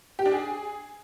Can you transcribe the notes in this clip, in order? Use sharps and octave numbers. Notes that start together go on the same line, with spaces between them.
G4
D4
G#4